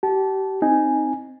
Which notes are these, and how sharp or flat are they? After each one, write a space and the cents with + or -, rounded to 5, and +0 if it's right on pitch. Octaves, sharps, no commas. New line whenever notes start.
G4 -35 A5 -20
C4 +0 D#4 +0 G#5 +0